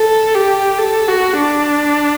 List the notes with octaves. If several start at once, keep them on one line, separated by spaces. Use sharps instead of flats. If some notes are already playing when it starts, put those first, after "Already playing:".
Already playing: A4
G4
A4
F#4
D4